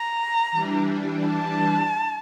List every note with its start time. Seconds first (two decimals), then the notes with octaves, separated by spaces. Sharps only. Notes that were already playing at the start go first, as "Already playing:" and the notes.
Already playing: A#5
0.52 E3 G3 D4
1.28 A5